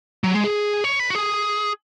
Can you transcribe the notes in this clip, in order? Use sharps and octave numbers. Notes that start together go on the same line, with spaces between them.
F#3
G#3
G#4
C#5
B4
F#4
G#4